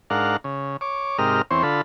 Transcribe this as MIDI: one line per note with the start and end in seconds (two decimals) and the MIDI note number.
0.10 0.37 44
0.10 0.37 62
0.10 0.37 70
0.10 0.37 77
0.10 0.37 78
0.44 0.77 49
0.81 1.18 73
0.81 1.18 86
1.18 1.42 44
1.18 1.42 48
1.18 1.42 67
1.18 1.42 70
1.18 1.42 75
1.18 1.42 89
1.51 1.63 40
1.51 1.63 60
1.51 1.63 72
1.51 1.63 73
1.63 1.81 50
1.63 1.81 65
1.63 1.81 69
1.63 1.81 83